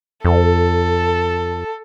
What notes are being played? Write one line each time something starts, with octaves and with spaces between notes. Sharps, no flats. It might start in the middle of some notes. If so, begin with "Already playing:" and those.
F2 A4